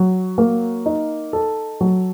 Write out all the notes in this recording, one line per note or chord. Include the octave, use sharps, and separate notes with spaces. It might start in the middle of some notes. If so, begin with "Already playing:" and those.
Already playing: F#3
A#3
D#4
A4
F#3